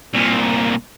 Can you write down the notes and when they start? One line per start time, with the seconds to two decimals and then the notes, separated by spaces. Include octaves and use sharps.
0.14 C2 A#2